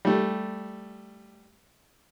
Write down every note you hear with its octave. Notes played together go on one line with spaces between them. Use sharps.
G3 A3